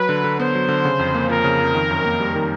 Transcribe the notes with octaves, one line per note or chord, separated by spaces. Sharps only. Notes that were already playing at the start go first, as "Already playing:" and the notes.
Already playing: F#3 B4
D3
D3
B3 C5
F#3
D3
C#3
F2
A#3
F3 A#4
C#3
F2
D#3
F#2
A#3
G3
D#3